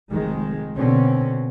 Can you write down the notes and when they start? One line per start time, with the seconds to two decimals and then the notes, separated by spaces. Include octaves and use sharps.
0.11 F1 D#3 G#3
0.77 B2 D3 C4 C#4